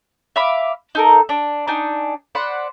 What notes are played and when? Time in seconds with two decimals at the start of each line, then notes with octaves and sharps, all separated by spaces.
0.36 E5 F5 B5 D6
0.95 D#4 A4 A#4
1.29 D4
1.68 D4 D#4 G#5
2.35 C5 D5 F#5 B5